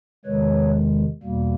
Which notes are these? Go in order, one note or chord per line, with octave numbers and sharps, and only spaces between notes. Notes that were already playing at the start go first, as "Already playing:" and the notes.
E2 C3 D#3 G#3 B4 C#5
E2 B2 G3 A#3